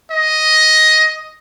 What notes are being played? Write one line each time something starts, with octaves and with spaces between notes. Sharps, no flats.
D#5